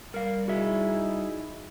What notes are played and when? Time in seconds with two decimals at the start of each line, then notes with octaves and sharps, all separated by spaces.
0.14 G3 A#4 F5
0.48 D#4 E4 F#4 G#4 E5